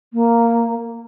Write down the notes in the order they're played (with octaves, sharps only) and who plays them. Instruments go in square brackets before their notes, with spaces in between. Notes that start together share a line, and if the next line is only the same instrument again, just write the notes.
[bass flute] A#3